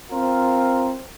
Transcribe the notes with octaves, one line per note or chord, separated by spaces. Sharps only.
C4 F4 A#4